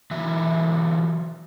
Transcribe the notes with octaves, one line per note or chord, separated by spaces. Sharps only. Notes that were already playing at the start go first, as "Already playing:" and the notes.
E3 F#3 E5